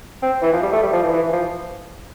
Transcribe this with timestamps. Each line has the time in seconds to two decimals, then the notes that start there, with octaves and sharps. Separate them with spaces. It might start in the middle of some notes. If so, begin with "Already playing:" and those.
0.23 C4
0.42 E3
0.53 F3
0.63 G3
0.72 A3
0.83 G3
0.93 F3
1.03 E3
1.13 E3
1.23 E3
1.33 F3